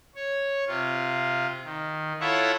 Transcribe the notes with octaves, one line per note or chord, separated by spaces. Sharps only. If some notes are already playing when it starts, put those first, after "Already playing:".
C#5
C3 F4
D#3
E4 F4 A4 C#5 E5 F#5